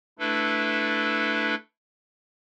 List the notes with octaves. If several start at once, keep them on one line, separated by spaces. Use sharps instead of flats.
A3 D4 E4 A4 B4